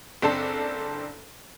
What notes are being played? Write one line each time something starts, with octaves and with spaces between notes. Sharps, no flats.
F#1 C4 D4 A4 A5